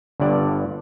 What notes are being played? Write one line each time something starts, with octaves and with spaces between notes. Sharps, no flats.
G1 G2 D3 D5